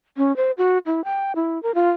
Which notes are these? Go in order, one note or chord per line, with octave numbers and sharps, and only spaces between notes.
C#4
C5
F#4
E4
G5
E4
A#4
F4